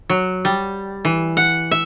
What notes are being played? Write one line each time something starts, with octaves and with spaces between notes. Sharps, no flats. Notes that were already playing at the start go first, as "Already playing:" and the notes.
F#3
G3
E3
F#5
E5